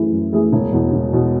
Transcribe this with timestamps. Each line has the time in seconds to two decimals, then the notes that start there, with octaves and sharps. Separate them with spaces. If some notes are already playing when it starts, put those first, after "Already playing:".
Already playing: F#2 E3 A3 E4 G#4
0.12 F#2
0.33 E3 A3 E4 G#4
0.53 E1
0.72 E2 B2
0.92 E1
1.13 E2 B2